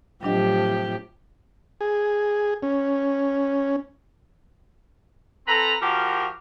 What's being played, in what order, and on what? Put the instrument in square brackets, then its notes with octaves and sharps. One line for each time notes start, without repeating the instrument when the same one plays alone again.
[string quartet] A2 C3 F3 [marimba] F#3 D4 D#5 [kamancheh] G4
[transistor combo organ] G#4
C#4
[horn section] C4 A4 B4 A#5
F3 F#4 G4 A#4